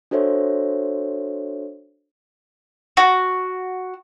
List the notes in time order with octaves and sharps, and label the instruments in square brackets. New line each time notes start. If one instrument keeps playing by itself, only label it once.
[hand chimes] D4 F#4 A4 C5 C#5 E5
[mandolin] F#4